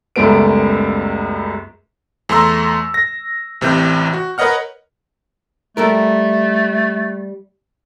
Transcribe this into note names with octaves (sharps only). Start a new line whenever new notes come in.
C#2 F#2 G3 A3 B3 D7
E2 A3 A#5 C6 E6
A#6
A1 C3 E3 G6
F#4
A#4 B4 C#5 D#5 F#5 F6
G3 A3 A4 A#4